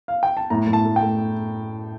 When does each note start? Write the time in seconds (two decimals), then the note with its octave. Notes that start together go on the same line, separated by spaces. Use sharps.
0.08 F5
0.23 G5
0.37 A5
0.50 A2 A#5
0.67 A2
0.73 A5
0.85 A3
0.96 G5
1.03 A3